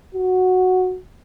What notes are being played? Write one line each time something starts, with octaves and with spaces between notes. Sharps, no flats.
F#4